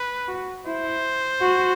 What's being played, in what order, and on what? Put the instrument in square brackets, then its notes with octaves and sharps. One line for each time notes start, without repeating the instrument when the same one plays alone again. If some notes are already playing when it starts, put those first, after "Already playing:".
Already playing: [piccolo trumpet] B4
[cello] F#4
[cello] E4 [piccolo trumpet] C5
[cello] F#4